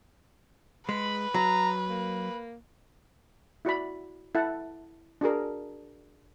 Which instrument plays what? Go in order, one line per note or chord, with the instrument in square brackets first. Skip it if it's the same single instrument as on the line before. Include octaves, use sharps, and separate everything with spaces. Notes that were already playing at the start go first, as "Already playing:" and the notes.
[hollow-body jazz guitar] G#3 [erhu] B4 [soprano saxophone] B5
[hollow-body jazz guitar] F#3 [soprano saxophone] A#5
[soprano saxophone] A#3
[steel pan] E4 F#4 D5 B5
E4 A4 F#5 A5
D4 F#4 G#4 A#4